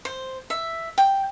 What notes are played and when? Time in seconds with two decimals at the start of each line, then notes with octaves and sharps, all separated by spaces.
0.05 C5
0.50 E5
0.98 G5